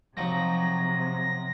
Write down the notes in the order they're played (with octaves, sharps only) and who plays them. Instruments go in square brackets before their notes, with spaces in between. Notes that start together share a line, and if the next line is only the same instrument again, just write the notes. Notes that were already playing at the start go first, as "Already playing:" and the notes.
[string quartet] C3 [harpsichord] F3 F#3 D#4 [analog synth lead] A#6